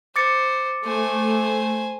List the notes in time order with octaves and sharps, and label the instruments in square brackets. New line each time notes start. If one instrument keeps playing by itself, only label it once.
[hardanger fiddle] C5 [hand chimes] D6 A6 C#7
[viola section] A3 [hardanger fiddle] C5 G#5